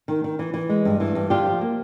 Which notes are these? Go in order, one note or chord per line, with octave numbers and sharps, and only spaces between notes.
D#3
D#3
E3
E3
G#3
G2
E3
G2
D3 F4 G4
F3
A#3